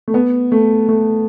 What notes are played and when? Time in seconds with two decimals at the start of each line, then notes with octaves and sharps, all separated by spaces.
0.08 A3
0.14 B3
0.52 A3
0.89 A3